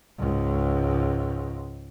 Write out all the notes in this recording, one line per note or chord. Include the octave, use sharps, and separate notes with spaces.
C#2 G#2